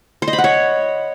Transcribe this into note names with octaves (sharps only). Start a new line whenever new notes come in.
C5
D#5
B5
F#5
C#5